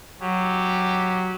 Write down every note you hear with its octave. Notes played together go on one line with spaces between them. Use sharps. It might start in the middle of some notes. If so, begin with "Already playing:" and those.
F#3 G4